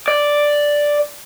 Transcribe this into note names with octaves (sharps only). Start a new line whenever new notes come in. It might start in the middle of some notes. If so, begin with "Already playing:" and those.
D5